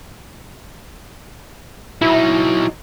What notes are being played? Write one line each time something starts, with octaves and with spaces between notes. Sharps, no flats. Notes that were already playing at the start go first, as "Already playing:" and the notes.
F#3 D#4 E4